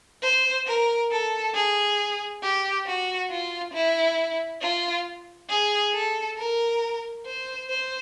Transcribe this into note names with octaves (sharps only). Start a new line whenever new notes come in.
C5
A#4
A4
G#4
G4
F#4
F4
E4
F4
G#4
A4
A#4
C5
C5